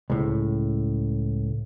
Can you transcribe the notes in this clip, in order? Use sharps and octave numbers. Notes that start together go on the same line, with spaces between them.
C#2 A2